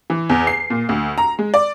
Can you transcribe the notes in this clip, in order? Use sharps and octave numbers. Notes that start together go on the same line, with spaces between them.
E3
E2
C7
A#2
D2
A#5
G#3
D5